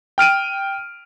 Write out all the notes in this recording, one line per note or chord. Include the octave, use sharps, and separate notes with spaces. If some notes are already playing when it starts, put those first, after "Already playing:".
G5 F6 D7 D#7